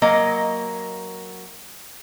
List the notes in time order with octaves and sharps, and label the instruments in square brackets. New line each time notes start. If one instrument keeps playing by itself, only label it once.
[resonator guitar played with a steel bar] F#3 A#3 D#5